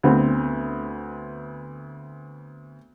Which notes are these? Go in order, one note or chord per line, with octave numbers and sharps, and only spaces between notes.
D2 B3 C4